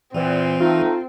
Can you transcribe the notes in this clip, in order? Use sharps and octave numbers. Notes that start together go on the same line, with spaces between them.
E2 A#2 E3 C4
A3 D#4 F4